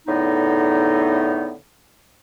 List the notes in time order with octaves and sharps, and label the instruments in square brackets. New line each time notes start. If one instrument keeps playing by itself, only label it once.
[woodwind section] E2 A2 D3 B3 D#4